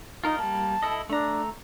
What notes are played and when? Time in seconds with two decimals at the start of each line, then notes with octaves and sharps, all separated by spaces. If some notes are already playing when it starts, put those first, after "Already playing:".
0.24 D#4 F4 A#4 D#5
0.39 G3 A#3 A5
0.83 E4 A4 D#5
1.10 A3 D4 A#5